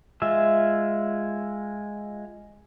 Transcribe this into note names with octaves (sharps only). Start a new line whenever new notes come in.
G#3 F4 E5